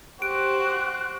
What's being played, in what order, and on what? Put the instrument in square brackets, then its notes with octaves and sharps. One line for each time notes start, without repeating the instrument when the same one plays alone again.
[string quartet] F#4 C5 [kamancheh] G4 [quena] F#6 [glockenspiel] D7